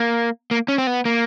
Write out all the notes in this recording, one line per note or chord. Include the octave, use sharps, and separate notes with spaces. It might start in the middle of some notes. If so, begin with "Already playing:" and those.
Already playing: A#3
A#3
C#4
C4
B3
A#3